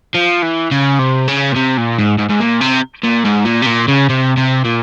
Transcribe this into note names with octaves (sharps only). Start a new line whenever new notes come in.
F3
E3
C#3
C3
C#3
A#2
C3
A#2
G#2
G#2
G#2
A#2
C3
A#2
G#2
A#2
C3
A#2
C#3
C3
C3
A#2